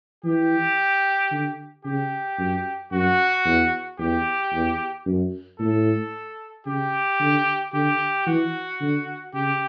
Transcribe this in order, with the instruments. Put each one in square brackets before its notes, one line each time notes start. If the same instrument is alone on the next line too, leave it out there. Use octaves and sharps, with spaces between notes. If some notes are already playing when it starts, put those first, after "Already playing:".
[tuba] E3 [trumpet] G4
[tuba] D3
[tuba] C#3 [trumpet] G4
[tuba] F#2
[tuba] F#2 [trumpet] F#4
[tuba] E2
[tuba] E2 [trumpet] G4
[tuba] E2
F#2
[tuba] A2 [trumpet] A4
[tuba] C#3 [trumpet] G4
[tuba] D3
[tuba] D3 [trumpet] G4
[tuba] E3 [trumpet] F#4
[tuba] D3
[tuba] C#3 [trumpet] G4